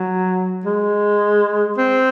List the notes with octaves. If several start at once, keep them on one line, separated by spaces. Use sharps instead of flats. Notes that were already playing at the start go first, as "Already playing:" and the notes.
Already playing: F#3
G#3
C4